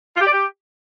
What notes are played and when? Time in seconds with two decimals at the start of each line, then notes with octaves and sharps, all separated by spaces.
0.15 F4
0.21 G4
0.26 D5
0.32 G4